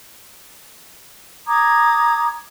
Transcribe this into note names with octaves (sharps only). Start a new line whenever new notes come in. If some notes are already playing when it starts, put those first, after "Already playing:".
A#5 D6 D#6 G#6